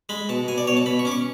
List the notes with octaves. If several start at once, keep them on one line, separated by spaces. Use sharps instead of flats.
G#3 B5
B2 A5
B2 G#5
D5
B2 C#5
A5
B2 B5
C#6
C#4 D6
C#6